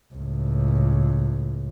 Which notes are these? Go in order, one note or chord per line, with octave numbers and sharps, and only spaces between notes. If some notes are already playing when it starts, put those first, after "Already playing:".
C#2 A2